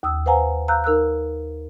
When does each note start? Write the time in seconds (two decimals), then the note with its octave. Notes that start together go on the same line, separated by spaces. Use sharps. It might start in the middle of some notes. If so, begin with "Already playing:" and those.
0.03 D#2 D#6 E6
0.26 B4 C5 F5 F#5 G#5 A#5
0.68 F5 A#5 E6 F#6 G6
0.84 D#4 A#4 E6 F#6